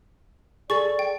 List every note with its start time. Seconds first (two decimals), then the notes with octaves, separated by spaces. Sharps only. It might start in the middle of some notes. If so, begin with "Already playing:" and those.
0.70 G#4 A4 D5 C#6 A6
0.99 G5